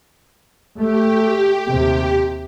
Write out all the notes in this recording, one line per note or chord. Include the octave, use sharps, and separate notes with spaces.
A3 G4
D#2 C3